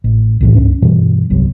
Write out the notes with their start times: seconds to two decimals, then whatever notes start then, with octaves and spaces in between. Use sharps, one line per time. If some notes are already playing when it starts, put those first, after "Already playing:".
0.04 A1
0.41 C2 A2 E3
0.54 C#2 G2 C#4
0.82 G2 B2 E3 G3
1.30 G1 C2 C3 F#3